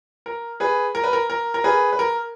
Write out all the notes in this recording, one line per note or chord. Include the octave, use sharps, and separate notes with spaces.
A#4
G#4 B4
A#4
B4
A#4
A#4
A#4
G#4 B4
B4
A#4